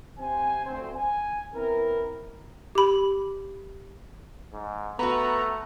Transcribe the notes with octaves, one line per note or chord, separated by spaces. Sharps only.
C3 C4 C5 G#5
D2 C4 C5
G#5
B3 C4 E4 A#4
G4 B5
G#2
A3 B3 F#4 B4 A#5